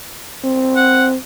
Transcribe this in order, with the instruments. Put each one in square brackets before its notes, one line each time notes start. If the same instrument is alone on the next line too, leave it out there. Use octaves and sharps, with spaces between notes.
[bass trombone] C4
[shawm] F#5